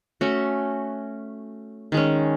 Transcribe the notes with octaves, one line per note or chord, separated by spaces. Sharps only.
A3 C#4 F#4
D#3 G#3 C#4